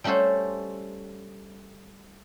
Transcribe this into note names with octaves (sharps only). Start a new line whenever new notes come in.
G3 A3 C#4 F#4 A4 C5